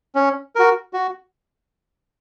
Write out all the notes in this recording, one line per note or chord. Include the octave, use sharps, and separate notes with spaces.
C#4
F#4 A#4
F#4